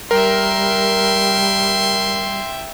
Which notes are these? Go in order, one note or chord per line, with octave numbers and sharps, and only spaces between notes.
G3 A#4 E5 G5 C6